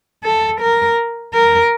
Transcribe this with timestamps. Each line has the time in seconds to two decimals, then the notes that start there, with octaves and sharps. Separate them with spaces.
0.24 A4
0.61 A#4
1.34 A#4